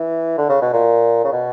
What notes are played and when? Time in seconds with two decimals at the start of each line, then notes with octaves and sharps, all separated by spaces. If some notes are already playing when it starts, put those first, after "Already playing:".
Already playing: E3
0.38 D3
0.49 C#3
0.62 B2
0.73 A#2
1.24 C#3
1.32 B2